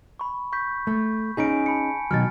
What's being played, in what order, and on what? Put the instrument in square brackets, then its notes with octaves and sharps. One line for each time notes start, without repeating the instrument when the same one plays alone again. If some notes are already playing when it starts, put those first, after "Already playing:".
[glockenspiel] B5 C#6
C#6 G6 B6
[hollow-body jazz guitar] A3
[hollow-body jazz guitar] C#4 D#4 G#4 [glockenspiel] G#5 B6 D7
[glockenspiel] A5 B5 C#7
[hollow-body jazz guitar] B2 D#3 F#3 [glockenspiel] F6 A6